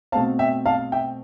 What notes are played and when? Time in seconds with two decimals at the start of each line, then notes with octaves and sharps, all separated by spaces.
0.12 B2 A3 C4 F5 A5
0.39 E5 G5
0.66 F5 A5
0.92 E5 G5